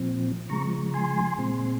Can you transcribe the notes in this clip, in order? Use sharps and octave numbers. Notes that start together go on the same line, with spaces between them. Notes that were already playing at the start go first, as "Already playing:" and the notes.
Already playing: A#2 F3 C4
C#3 F3 G#3 A#5 C#6
G#5 C6
A#2 G#3 C4